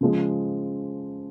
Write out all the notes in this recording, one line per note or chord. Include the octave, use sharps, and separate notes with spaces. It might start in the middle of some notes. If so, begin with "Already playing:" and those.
C#3 F3 G#3